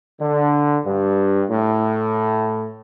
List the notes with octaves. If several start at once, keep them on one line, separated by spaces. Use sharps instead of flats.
D3
G2
A2